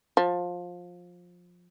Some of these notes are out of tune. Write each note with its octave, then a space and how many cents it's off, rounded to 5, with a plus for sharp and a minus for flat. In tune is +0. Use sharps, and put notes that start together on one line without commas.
F3 +20